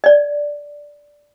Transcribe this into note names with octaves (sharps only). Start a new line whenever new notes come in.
D5 D#5